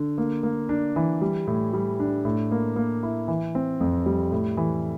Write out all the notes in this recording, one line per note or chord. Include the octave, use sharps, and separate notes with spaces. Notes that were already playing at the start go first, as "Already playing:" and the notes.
Already playing: D3
A#3
A#3
D4
E3
G3
A2
G3
D4
A2
A#3
A#3
E4
E3
C4
F2
G3
A2
E3